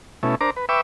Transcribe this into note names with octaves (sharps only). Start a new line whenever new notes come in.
B2 A3 C#4 E4
D4 A#4 C5 A#5 D6
B4
B4 E5 G5 C#6 D6 E6